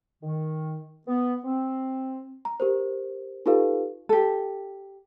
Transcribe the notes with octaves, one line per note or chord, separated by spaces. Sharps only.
D#3
B3
C4
A#5
G4 A#4 C5
D#4 F4 G4 A4 B4 F5
G4 A4